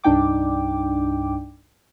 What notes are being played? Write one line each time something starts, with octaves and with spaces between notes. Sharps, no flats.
C2 G2 D4 D#4 G5 D6